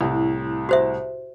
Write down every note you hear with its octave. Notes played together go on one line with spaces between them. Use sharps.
C2 A2
F#4 C5 E5